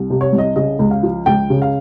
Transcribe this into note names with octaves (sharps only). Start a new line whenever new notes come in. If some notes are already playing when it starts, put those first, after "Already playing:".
Already playing: C2
C3
C#5
C2
D#5
C#3 D#5
C#2
F5
F3
C#2 G5
C#3
F5